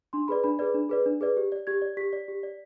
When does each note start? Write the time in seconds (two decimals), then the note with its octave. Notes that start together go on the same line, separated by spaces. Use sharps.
0.13 D4 C6
0.28 G#4 B4 D5 B5
0.44 D4 B5
0.59 G#4 B4 D5
0.74 D4
0.89 G#4 B4 D5
1.06 D4
1.21 G#4 B4 D5
1.37 G4
1.52 D5
1.67 G4 G#6
1.82 D5
1.97 G4 B6
2.13 D5
2.28 G4
2.43 D5